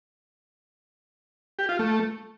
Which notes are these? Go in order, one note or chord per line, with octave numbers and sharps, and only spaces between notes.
G4
F4
A3